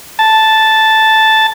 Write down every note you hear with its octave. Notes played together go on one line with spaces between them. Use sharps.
A5